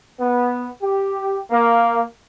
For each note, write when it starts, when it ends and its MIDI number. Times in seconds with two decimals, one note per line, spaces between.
0.20 0.67 59
0.82 1.40 67
1.50 2.01 58